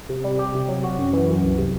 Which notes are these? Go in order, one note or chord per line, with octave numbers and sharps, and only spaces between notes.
C3
G3
G4
C3
F#3
F#4
F#2
E3
F#2
C2
C3